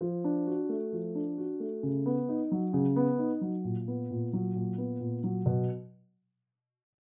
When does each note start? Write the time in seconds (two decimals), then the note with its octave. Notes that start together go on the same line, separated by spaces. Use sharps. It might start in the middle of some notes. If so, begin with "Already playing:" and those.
0.01 F3
0.24 D4
0.47 F#4
0.69 A3
0.92 F3
1.15 D4
1.38 F#4
1.60 A3
1.83 C#3
2.06 B3
2.29 D#4
2.52 F#3
2.73 C#3
2.96 B3
3.18 D#4
3.41 F#3
3.64 A#2
3.88 B3
4.11 A#2
4.33 F#3
4.55 A#2
4.78 B3
5.00 A#2
5.24 F#3
5.46 B2